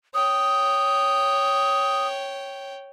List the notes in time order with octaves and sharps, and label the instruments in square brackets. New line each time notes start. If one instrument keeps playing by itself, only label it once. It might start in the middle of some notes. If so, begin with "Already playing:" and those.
[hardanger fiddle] C#5 G5 [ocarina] D#6